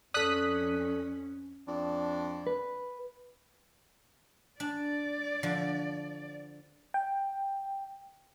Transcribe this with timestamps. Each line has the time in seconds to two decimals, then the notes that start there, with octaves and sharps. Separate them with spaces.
0.14 F2 C#4 A4 D5 D#6 F#6 B6
1.67 F2 D4
2.47 B4
4.60 D4 D5
5.43 D3 F3
6.94 G5